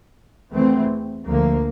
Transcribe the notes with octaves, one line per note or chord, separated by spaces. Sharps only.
E2 E3 A3 C4
D2 D3 F3 A#3